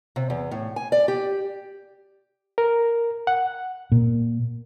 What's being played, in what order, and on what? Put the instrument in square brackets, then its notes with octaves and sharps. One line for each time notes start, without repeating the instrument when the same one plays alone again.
[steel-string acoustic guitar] C3
E2
A2
G#5
D5
G4
[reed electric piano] A#4
F#5
[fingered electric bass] A#2